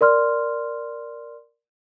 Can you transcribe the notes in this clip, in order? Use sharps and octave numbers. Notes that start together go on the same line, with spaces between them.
A#4 D5 C6 F6